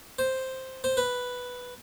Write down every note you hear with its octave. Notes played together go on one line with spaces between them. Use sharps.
C5
C5
B4